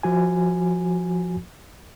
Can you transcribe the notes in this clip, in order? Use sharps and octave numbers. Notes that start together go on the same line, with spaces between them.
F3 F#4 G#5